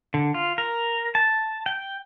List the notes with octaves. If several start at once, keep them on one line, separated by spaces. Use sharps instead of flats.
D3
F4
A#4
A5
G5